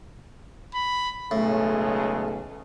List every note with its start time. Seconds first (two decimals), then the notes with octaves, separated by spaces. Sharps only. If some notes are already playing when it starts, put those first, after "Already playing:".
0.74 B5
1.31 B1 A2 C#3 G#3 A4